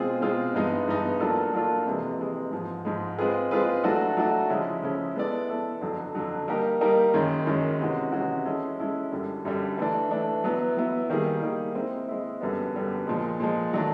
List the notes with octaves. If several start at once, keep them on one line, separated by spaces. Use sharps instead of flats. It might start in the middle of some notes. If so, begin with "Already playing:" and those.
Already playing: B2 G#3 C4 F4 G#4
B2 G#3 C4 F4 G#4
G2 E3 G#3 B3 D#4
G2 E3 G#3 B3 D#4
F#3 A#3 D4 F4 A4
F#3 A#3 D4 F4 A4
F2 C3 E3 G#3
F2 C3 E3 G#3
G#2 F3 G#3
G#2 F3 G#3
G#3 C4 F4 G#4 B4
G#3 C4 F4 G#4 B4
F#3 A3 D4 F#4 A4
F#3 A3 D4 F#4 A4
C#3 F3 G#3 C#4 E4
C#3 F3 G#3 C#4 E4
G#3 B3 E4 A4 D5
G#3 B3 E4 A4 D5
F2 D3 F#3
F2 D3 F#3
G3 A#3 D#4 G4 A#4
G3 A#3 D#4 G4 A#4
F#2 D#3 G#3 C#4
F#2 D#3 G#3 C#4
C3 E3 G#3 C#4 F#4
C3 E3 G#3 C#4 F#4
G#3 C#4 E4 A4
G#3 C#4 E4 A4
F#2 D3 G3
F#2 D3 G3
E3 A3 D4
E3 A3 D4
F#3 B3 E4
F#3 B3 E4
D#3 G3 A#3 D#4 G#4
D#3 G3 A#3 D#4 G#4
G#3 C4 E4
G#3 C4 E4
F#2 D3 G3 B3
F#2 D3 G3 B3
A#2 F3 G#3
A#2 F3 G#3
D#3 F#3 A3 D4